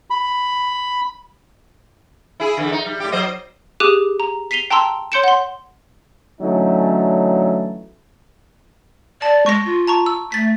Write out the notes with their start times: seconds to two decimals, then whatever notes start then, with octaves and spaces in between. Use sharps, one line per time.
0.10 B5
2.40 E4 G#4
2.57 D3 E3
2.72 D#4
2.86 G3
3.00 A2 G4
3.12 F#3 C5 D#5
3.80 G4 G#4 D6 D#6 F#6 D#7
4.20 A#5
4.51 B6 C7 D#7 F7 G7
4.70 G5 A5 A#5 C6 E6
5.12 C#5 C6 G6 C#7 D7 E7
5.24 F#5 C6
6.42 D3 E3 F#3 A3 C#4 D#4
9.22 D5 A5
9.46 G#3 C#6 A#6
9.65 F4
9.87 A5 A#5 C#6
10.06 E6
10.32 A3 A6 B6